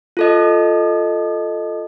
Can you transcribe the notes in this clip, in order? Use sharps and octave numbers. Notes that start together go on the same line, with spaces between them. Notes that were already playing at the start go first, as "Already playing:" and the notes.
F4 A4 D#5